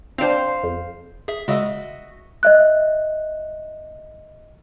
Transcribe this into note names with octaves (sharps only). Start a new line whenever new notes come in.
C4 D4 C5 F5
F2
G#4 E5
C#3 G#3 F#4 D#5 E5
D#5 E5 F#6